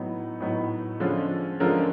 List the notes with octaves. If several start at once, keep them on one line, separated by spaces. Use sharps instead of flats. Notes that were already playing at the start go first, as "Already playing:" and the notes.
Already playing: A2 F#3 B3 D#4
A2 F#3 B3 D#4
D3 F3 G#3 C#4 F4
D3 F3 G#3 C#4 F4 A#4